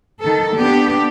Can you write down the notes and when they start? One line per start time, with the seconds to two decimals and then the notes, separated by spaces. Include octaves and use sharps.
0.20 D#3 A4
0.56 B3 D4 G4